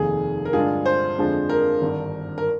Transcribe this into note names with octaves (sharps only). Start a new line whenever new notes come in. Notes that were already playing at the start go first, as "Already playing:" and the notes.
Already playing: F1 D#2 D#3 G#4
A#4
G2 D3 G#3 D4 F4 G#4
C5
F2 D3 F3 G#3 D4
A#4
G#1 G2 D3
A#4